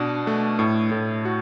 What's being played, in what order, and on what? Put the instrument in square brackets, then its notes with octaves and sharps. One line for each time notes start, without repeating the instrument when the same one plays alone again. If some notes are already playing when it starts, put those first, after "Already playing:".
Already playing: [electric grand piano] B2 D4 F#4
A3
A2
A2
F#4